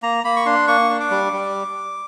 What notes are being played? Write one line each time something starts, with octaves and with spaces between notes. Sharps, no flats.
A#3 A#5
A#3 B5
C#6
D4 C6
A#3 C#6
D4
D6
G3
G3